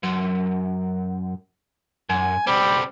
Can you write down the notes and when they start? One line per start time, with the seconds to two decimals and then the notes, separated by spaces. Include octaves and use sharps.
0.04 F#2
2.10 F#2 G#5
2.47 B1 G3 C4